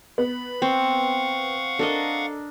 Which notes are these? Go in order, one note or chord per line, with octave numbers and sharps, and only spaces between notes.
B3 B5
C4 F5 F#5 C#6
D4 A4 A#4 D#5